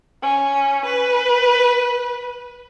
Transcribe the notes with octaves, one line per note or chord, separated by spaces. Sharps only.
C#4
B4